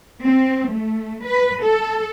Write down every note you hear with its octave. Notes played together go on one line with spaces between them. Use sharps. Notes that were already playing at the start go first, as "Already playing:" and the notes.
C4
A3
B4
A4